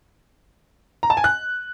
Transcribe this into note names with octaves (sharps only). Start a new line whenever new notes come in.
A#5
A5
G#5
F#6